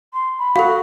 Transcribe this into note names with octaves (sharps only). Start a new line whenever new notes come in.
C6
B5
F#4 A4 F5